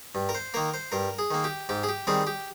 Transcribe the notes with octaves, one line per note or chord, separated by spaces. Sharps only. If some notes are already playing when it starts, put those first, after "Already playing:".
G2
A#4
C5
D#3 A#3 A#4
C5
G2 A#4
G#4
D#3 A#3
G4
G#2 G4
G#4
G4
D#3 G3 C4 G#4
G4